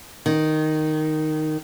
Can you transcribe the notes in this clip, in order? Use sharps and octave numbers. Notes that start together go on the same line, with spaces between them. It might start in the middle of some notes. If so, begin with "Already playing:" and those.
D#3